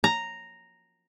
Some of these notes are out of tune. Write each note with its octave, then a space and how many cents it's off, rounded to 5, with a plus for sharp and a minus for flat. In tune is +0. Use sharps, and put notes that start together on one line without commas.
A#5 -5